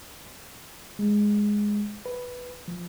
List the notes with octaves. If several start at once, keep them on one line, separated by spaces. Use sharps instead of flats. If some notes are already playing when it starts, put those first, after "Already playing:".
G#3
B4
F3